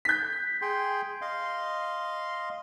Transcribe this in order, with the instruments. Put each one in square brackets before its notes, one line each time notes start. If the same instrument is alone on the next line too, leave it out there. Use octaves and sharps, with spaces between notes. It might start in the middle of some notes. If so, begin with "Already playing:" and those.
[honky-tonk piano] G6 B6
[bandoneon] G#4 G5 C6
D#5 F5 C6